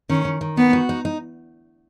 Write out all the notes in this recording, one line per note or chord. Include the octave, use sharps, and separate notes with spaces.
D#3 C#4
D#3
D#3
B3 D#4
F#4
D#4
D#4